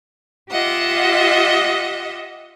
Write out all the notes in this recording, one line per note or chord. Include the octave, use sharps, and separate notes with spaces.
F4 G4 D#5 E5 F#5